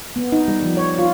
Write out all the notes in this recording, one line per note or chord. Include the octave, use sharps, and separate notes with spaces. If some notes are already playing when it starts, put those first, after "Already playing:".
B3
D#4
G3
F3
C#5
F4